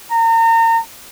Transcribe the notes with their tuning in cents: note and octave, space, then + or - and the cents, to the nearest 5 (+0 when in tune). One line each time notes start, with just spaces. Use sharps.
A#5 -35